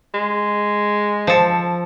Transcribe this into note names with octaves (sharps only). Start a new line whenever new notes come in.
G#3
F3 A4